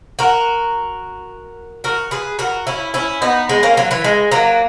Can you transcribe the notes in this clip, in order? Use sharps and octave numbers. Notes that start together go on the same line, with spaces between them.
F#4 A#4
F#4 A#4
G#4 B4
F#4 A#4
C#4 E4
C#4 E4
B3 D#4
G#3 B3
A#3 C#4
F#3
E3
G#3
F#3 A#3